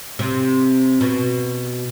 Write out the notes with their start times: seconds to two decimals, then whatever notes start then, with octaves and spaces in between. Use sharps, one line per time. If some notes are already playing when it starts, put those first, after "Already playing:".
0.19 C3
1.01 B2